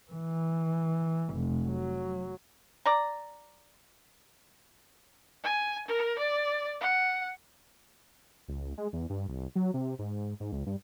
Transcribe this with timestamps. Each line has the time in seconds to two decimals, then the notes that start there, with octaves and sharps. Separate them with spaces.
0.12 E3
1.34 F1
1.67 F#3
2.85 D5 A#5
5.44 G#5
5.88 A#4
6.18 D5
6.81 F#5
8.48 C#2
8.78 G#3
8.93 E2
9.10 G2
9.28 C2
9.56 F#3
9.74 C3
9.99 G#2
10.40 G#2
10.52 C#2
10.66 G2